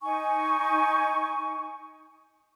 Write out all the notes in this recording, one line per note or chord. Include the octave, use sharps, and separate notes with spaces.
D#4 G#5 C#6